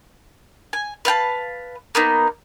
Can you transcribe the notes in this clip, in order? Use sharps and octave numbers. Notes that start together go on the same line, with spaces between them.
G#5
B4 F5 G5 A5
A#3 B3 D#4